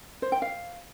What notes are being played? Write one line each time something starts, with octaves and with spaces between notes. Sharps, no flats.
C5
G5
F5